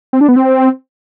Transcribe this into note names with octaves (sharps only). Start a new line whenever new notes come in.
C4
D4
B3
C4